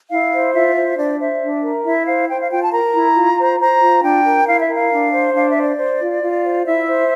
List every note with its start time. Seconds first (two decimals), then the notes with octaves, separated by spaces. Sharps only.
0.10 E4 F5
0.32 C5
0.54 F4 E5
0.76 C5
0.97 D4 D5
1.19 C5 E5
1.41 D4
1.63 A#4
1.85 E4 E5
2.06 C5 F5
2.28 C5 G5
2.40 F5
2.50 F4 G5
2.61 A5
2.72 A#4 A#5
2.94 E4
3.16 F4
3.38 C5
3.60 C5 A#5
3.81 F4
4.03 D4 G5
4.25 A#4
4.47 E4 F5
4.60 E5
4.69 A#4
4.74 F5
4.91 D4
5.13 C5
5.34 D4 F5
5.49 E5
5.56 C5
5.63 D5
5.78 C5
6.00 F4
6.22 F4
6.44 C5
6.65 E4 E5
6.87 C5